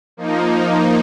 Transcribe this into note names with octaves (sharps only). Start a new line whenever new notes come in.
F3 A#3 D#4